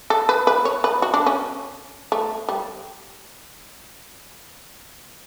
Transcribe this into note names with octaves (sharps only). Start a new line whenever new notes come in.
A4
B4
B4
C#5
B4
F#4
D4
C#4
A3
G3